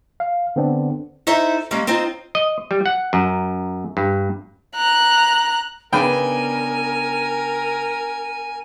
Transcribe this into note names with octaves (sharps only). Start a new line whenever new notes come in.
F5
D3 B3 C4 D4
D#4 E4 A4 C5 E5
G3 G#3 A#3 C#4
C4 D#4 F4 C5
D#5
G3
F#5
F#2
G2
A#5 F#6
C#3 B3 D4 A#4 G5 G#5 B5